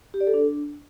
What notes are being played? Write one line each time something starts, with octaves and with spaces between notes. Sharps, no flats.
G4
D5
A4
D4